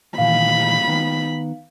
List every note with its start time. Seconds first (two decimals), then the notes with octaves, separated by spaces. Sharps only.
0.18 A#2 D#3 E3 F5 B5
0.87 D#3 B3